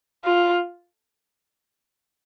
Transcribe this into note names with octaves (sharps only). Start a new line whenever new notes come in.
F4